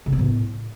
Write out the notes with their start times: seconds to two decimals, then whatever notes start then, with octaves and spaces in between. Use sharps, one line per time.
0.06 C#3
0.13 B3
0.19 A2